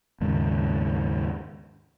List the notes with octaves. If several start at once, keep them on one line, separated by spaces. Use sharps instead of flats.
D#2 G#2 C#3